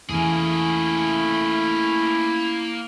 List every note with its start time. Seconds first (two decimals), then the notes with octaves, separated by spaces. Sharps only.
0.09 E2 E3 A3 A#3 C#4 E4 G#4